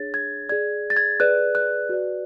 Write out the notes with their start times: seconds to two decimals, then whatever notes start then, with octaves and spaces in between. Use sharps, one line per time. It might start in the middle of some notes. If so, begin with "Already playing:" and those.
Already playing: D4 G#4 C#5 A6
0.14 G#6
0.49 G#4 D5 G#6
0.90 A6
0.96 G#6
1.20 G#4 B4 D5 F#6
1.55 F#6
1.89 F#4 B4 D5